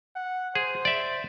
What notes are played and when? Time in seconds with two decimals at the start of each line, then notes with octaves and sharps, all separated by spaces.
0.16 F#5
0.55 G#4 C5
0.85 D5 E5